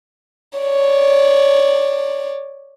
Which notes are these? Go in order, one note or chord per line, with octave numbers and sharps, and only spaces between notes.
C#5 D5